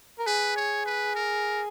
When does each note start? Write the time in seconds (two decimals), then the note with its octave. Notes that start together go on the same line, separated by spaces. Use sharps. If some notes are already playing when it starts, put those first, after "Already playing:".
0.19 A#4
0.27 G#4 B4
0.56 C#5
0.86 B4
1.15 A#4